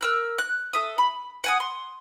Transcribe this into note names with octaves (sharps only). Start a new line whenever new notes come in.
A#4 E6 F#6
F#6
A4 E5 D#6
B5
F#5 G#5 D#6
C6